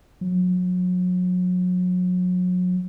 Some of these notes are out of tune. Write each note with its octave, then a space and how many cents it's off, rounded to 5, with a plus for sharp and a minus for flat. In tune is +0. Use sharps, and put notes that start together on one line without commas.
F#3 -35